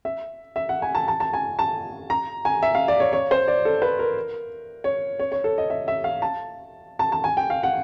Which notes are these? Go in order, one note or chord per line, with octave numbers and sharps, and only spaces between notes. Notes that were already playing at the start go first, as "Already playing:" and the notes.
E5
E5
F#5
G#5
A5
A5
A5
G#5
A5
A#5
G#5
E5
F5
D5
C#5
C#5
C5
D5
A4
B4
A#4
C#5
C#5
C#5
A4
D#5
E5
E5
F5
A5
A5
A5
G#5
G5
F5
F#5